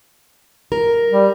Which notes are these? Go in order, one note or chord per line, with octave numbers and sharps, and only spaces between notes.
A#4
G3